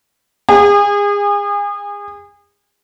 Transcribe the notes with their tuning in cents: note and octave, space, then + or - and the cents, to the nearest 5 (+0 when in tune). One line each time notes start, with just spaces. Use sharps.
G#4 -35